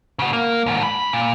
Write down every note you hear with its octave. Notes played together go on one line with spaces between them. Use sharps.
C#3 F#4
A#3
D#2 G#2
G2 B5
A#2